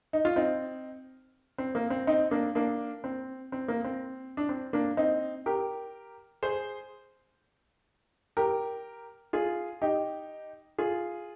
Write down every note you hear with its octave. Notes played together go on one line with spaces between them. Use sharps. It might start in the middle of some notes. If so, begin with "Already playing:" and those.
D#4
F4
C4 D#4
C4
A#3
C4
C4 D#4
A#3 D4
A#3 D4
C4
C4
A#3
C4
D4
C4
A#3 D4
C4 D#4
G4 A#4
G#4 C5
G4 A#4
F4 G#4
D#4 G4
F4 G#4